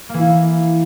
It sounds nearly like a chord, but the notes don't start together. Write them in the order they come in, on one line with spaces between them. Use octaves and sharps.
A#3 E3 E4